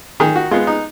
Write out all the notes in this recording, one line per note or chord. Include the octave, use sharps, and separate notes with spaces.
D#3 G#4
F#4
G#3 B3 F4
D#4